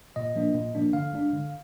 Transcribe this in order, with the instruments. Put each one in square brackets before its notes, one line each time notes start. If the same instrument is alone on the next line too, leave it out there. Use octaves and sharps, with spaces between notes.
[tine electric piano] A#2 D#5
F3 A#3 D4
A#2
F3 A#3 D4
D3 F5
G#3 D4
D3